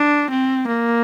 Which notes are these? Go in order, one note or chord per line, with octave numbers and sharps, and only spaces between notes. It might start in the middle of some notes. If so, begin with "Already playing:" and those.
Already playing: D4
C4
A#3